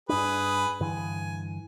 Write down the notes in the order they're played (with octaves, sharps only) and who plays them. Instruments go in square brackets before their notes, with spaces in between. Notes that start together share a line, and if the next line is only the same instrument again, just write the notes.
[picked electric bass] G2 D4 [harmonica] G#4 B4
[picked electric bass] G2 D3 E3 [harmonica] G#5